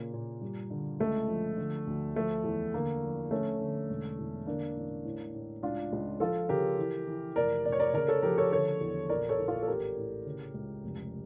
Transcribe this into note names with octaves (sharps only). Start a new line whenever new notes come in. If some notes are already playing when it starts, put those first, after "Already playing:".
Already playing: A#2 C#3 A#3
A#2
G2
D3
C#2 A3
F3
D3
D2
F3 A3
E2
D3 A#3
F3
D3 A3 C#4
D3
E1
E2
D3 A#3 D4
A1
A2
A2
C#2 D4 F4
C#2
F3 F4 A4
C#3 G4 A#4
E3
E3
F1 A#4 D5
F1 D5
C#5
A#4 D5
C#3 A#4 D5
A4 C#5
F3 G4 A#4
A4 C#5
D3 A4 C#5
E2
A#1 A#4 D5
A4 C#5
A#1
F4 A4
A4
A1 G4 A#4
A2
C#3
C#2
F1